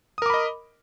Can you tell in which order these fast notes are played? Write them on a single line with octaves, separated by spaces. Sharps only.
D#6 A#4 D6 B5 D#5